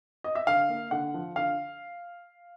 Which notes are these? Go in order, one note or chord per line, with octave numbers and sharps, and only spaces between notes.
D#5
E5
D3 F5
A#3
D3 F#5
F3
D3 F5